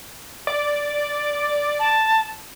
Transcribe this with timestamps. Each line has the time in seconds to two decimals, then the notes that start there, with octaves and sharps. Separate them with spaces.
0.47 D5
1.79 A5